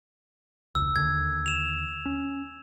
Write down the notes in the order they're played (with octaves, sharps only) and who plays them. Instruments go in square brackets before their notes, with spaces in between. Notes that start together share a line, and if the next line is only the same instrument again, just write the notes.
[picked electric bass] E1 C#2 [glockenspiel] E6
[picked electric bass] D#2 D3 [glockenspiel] G#6
[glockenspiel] E7 F7
[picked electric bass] C#4